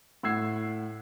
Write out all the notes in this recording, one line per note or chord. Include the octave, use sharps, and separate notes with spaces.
A2 F#5 E6 G#6 C7